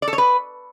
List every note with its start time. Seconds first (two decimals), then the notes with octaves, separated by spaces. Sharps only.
0.02 D5
0.08 A4
0.13 C#5
0.18 B4